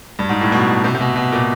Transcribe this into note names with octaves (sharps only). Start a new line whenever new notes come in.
G2
G#2
A2
B2
C3
C3
B2
B2
A#2